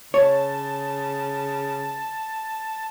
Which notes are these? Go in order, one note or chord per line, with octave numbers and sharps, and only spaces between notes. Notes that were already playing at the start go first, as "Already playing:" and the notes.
C#3 C#5 A5